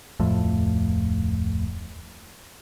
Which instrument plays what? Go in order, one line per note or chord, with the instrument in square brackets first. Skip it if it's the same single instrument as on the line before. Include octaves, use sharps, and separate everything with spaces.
[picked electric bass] D1 F2 A2